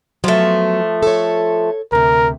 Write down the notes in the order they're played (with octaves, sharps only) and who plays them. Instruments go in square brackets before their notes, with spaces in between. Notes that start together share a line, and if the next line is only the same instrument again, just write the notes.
[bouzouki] F3 A3 [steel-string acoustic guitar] F#3 B3
[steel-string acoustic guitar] A4 C#5
[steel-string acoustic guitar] D2 C3 [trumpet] A#4